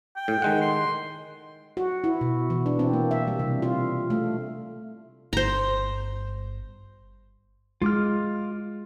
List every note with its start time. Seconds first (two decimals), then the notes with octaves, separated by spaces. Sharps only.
0.16 G5
0.28 A2
0.42 D#3 G#3 F#5
0.61 C6
1.77 F#4
2.04 E4
2.21 B2
2.50 E3
2.66 D4
2.79 C4
2.93 A#3
3.11 E5
3.28 G3
3.39 C3
3.62 F4
4.10 A3
5.33 G1 G2 C5 A#5
7.82 G#3 F4 D6 F6